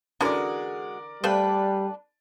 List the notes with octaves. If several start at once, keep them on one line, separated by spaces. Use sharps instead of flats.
D3 E3 G#3 C#4 F#4 A#4 D5
G3 A3 D4 A4 B4 C5 F5